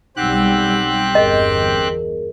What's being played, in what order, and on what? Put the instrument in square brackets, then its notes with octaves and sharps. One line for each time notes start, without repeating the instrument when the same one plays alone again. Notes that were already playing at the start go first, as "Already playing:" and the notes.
[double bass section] B1 G3 [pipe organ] C4 G4 F#6 [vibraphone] D#4 F#5 E6
[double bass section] G1 E2 [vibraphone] G#4 A#4 [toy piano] D#5